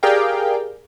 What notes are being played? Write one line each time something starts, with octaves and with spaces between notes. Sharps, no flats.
G4 G#4 A#4 D5 F5 G5